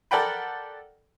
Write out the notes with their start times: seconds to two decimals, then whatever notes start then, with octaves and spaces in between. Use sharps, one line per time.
0.11 A4 A#4 D5 F#5 G5 B5